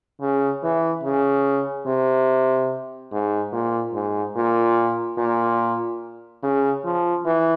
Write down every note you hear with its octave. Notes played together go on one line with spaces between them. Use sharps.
C#3
E3
C#3
C3
G#2
A#2
G#2
A#2
A#2
C#3
F3
E3